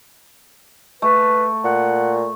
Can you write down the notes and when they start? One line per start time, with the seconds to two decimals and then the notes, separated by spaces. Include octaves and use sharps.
1.02 A3 B4
1.64 A#2 F#5